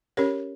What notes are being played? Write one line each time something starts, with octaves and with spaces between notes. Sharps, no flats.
C#4 G4 A#4 C#5